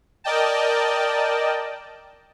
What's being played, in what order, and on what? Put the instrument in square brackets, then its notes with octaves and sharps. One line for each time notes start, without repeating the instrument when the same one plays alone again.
[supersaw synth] A#4 D5 D#5 G5 A5